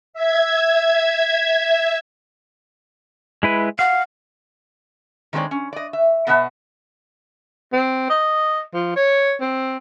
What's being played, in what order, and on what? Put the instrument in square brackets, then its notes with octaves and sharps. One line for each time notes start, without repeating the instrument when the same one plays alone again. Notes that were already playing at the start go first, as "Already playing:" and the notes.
[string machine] E5 G#6
[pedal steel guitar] G#3 E4 B4
[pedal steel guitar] F5 [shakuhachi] F#5
[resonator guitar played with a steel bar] D#3 G#3 C4 F#4 C#5 D5
C#4
D5 D#5
E5
B2 B3 B4 E5 F#5 A5
[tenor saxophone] C4
D#5
F3
C#5
C4